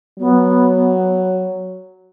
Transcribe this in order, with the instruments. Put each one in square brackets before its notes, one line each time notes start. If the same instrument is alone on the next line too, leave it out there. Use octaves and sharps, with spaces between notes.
[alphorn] F#3 [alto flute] B3